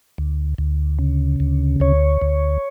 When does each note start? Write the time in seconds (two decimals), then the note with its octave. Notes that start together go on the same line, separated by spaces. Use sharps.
0.18 D2
0.58 D2
0.99 C#3
1.40 D2
1.80 D2 C#5
2.21 D2